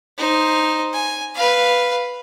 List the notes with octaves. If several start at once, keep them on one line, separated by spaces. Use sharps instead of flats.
D#4 C5
G#5
B4 F5